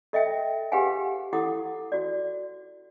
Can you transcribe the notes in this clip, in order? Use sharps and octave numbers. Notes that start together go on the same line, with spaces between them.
A4 D#5 E5 G5
G4 G#4 B4 F5 F#5 G#5
E4 A4 F#5 D6 D#6
F#4 D5